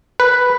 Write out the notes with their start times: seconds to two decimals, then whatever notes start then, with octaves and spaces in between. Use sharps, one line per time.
0.20 B4